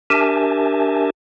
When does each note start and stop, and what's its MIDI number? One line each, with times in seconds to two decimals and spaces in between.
0.10 1.10 62
0.10 1.10 67
0.10 1.10 70
0.10 1.10 76
0.10 1.10 80
0.10 1.10 81